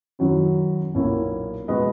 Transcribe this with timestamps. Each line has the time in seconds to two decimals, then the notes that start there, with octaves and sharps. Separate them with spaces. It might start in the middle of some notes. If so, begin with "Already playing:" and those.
0.19 F#2 D#3 F#3 C#4 E4
0.94 B1 A#2 A#3 C#4 E4
1.68 B2 G#3 B4 D#5